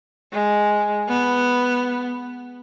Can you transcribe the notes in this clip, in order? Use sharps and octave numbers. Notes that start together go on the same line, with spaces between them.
G#3
B3